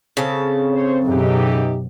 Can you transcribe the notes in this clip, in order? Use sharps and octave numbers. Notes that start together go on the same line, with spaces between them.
C#3 C4 A4
C5 C#5
F#2 B2 E3 D#4 G4